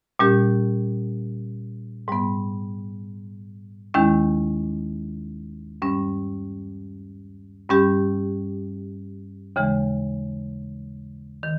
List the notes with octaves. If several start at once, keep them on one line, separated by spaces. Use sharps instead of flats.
A#2 G3 C#4 G4
G#2 G3 B3
D#2 D#3 G#3 C#4 E4
G2 G3 C#4
G2 G3 C#4 G4
D#2 C#3 E3 G#3
D#3